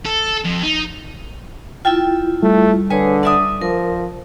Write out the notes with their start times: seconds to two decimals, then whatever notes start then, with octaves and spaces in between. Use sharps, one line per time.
0.05 A4
0.45 F2
0.63 D#4
1.85 E4 F4 G5 A5
2.43 G3 A3
2.90 D3 G#4 B4 C#5
3.23 D4 D5 E5 D#6
3.62 F3 A#4